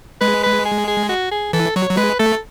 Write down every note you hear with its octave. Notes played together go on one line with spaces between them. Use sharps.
G#3 B4
B4
G#4
G#4
F#4
G#4
E3 A4
F#3 C#5
F#3
G#3 B4
A3 A4